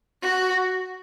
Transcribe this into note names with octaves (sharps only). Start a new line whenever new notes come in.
F#4